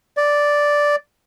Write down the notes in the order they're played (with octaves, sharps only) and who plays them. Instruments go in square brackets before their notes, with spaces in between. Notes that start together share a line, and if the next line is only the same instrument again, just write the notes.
[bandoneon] D5